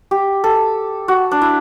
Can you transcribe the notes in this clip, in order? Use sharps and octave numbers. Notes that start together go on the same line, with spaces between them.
G4
A4
F#4
D4
E4